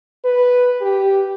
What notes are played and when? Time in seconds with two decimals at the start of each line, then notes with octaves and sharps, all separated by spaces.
0.24 B4
0.81 G4